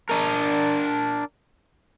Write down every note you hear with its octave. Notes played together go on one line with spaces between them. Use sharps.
D4 A#4